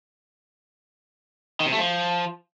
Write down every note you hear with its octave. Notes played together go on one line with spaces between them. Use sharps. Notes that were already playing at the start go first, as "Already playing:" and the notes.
D#3
C3
A3
F3